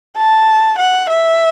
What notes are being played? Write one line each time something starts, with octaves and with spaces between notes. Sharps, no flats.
A5
F#5
E5